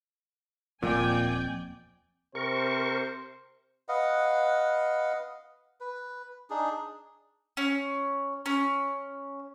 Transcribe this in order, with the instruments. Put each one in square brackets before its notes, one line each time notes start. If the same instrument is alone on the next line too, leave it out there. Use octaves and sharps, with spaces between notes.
[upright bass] D#1 A#3 [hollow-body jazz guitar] F2 [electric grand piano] A#2 [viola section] D5 G5 G#5
[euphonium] C3 [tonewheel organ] A#4 C#6 [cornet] C5
[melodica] B4 D#5 F5 F#5
B4
D4 D#4 G#4
[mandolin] C#4
C#4